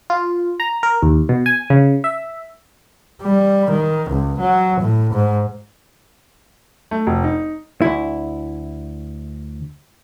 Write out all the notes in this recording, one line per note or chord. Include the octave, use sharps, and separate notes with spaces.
F4
A#5
A#4
D#2
B2
G#5
C#3
E5
G3
D#3
C#2
F#3
A2
G#2
A3
F1
D#4
D2 E4